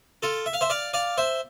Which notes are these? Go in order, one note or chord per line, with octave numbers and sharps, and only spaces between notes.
F4 A4
E5
F5
C5 E5
D5 F5
D5 F5
C5 E5